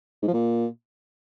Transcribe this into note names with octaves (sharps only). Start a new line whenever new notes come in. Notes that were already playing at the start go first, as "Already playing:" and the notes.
G#2
F3
A#2